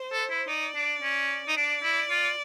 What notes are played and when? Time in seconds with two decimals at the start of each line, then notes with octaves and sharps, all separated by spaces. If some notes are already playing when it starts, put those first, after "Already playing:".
Already playing: C5
0.12 A4
0.30 E4
0.48 D#4 D5
0.75 D4
1.02 C#4
1.48 D#4
1.57 D4 D5
1.83 E4
2.10 F4